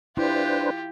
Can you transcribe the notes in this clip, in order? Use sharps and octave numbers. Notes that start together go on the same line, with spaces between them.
D4 E4 F4 G4 B4 C5